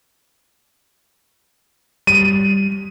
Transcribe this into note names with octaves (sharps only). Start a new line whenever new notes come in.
G3 D#7